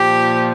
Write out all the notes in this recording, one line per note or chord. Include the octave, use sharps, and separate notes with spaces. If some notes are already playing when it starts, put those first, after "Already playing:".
Already playing: A#2 F3 G4